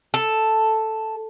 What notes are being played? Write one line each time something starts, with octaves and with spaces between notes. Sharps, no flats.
A4